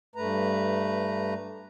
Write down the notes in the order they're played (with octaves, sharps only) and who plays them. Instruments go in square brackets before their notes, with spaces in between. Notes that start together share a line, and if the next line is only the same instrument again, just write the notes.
[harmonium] G2 A3 B4 A#5